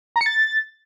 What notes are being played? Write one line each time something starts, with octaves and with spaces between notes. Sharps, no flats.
A#5
C#7
A6